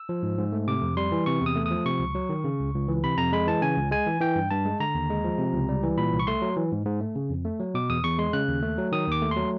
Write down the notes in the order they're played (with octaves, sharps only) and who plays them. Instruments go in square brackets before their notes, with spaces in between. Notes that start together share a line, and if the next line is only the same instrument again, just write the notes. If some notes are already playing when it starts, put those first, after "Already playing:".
Already playing: [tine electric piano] E6
F3
G#2
G#2
A3
C3 D6
F2
G3 C6
E3
C3 C#6
E2
D#6
A3
F3 D#6
C3 C#6
C#2
F#3
D#3
C#3
C#2
C#2
E3
C3 B5
F2 A#5
G#3 B5
E3 A5
C#3 G#5
C#2
G#3 G#5
E3
E3 G5
G2
G2 A5
G#3
D3 A#5
D#2
G#3
F3
C3
C#2
G3
E3
A#2 B5
C2
C#6
A3 C6
F#3
E3
G#2
G#2
A3
C#3
F2
A3
F#3
B2 D6
E2 D#6
E2 C#6
G#3 C6
C#3 F#6
D#2
A3
F#3
D#3 D#6
D#2 D6
A3
F#3 C6